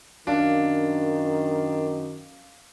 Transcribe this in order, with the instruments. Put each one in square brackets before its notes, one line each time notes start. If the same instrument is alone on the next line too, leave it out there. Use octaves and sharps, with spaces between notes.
[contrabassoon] F#2 [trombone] D#3 [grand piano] D4 [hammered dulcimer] F5